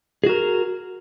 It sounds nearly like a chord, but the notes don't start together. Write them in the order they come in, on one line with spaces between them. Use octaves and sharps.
G#4 F#4 A#4